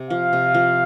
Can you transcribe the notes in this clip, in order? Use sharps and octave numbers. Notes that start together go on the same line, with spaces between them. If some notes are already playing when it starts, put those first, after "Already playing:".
Already playing: C3
F3 F5
C3
F3